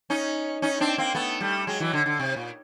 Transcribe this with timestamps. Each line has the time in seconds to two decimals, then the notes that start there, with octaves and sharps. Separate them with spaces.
0.10 C#4 D#4
0.62 C#4 D#4
0.80 C4 D4
0.98 A#3 C4
1.15 A3 B3
1.41 G3 A3
1.67 F#3 G#3
1.80 E3 F#3
1.93 D3
2.06 D3
2.19 C3
2.36 A#2